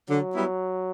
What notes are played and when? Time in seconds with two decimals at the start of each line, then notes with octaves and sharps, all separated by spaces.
0.09 D3 F#3
0.34 G3 B3 E4